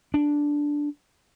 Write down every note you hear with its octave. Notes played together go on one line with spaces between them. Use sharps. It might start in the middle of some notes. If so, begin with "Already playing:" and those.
D4